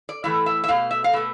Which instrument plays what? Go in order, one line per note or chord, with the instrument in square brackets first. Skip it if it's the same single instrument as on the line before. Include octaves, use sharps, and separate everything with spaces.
[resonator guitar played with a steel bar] D5
A2 E3 A3 E5
E5
E5
B2 A3 F5
E5
F5
B2 A3 E5